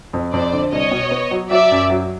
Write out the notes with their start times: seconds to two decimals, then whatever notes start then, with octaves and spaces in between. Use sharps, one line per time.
0.13 F2
0.33 F2 C5 D5
0.53 D3
0.72 C2 C#5 D#5
0.91 B2
1.11 B3
1.31 F#3
1.51 F#3 D5 E5
1.71 F#2
1.90 F#3